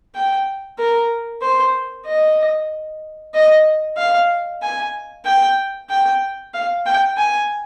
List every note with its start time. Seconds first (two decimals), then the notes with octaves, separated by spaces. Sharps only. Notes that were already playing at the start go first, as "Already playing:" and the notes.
0.15 G5
0.78 A#4
1.42 C5
2.06 D#5
3.34 D#5
3.97 F5
4.62 G#5
5.25 G5
5.90 G5
6.54 F5
6.86 G5
7.17 G#5